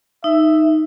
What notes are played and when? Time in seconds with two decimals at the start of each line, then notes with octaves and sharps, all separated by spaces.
0.24 D#4 E5